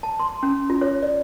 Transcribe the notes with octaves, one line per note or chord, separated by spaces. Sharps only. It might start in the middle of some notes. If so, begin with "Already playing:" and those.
A5
C6
C#4
F4
C#5
D5